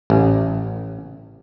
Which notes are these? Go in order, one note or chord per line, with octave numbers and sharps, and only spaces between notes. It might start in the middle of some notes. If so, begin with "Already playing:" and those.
A1